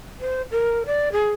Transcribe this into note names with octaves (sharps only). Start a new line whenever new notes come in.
C5
A#4
D5
G#4